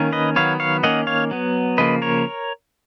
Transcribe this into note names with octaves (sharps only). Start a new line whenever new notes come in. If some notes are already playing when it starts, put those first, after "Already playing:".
Already playing: D#3 A#3 C#4
B4 D#5
D#3 F#3 B3 C#5 F5
C#5 F5
D#3 A#3 C#4 D#5 F#5
C#5 F5
F#3 B3
C#3 F3 A#3 B4 D#5
A#4 C#5